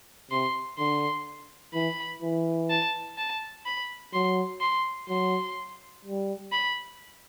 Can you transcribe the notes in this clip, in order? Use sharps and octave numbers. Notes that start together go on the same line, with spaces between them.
C3 C6
D3 C6
E3 B5
E3
A5
A5
B5
F#3 C6
C6
F#3 C6
G3
B5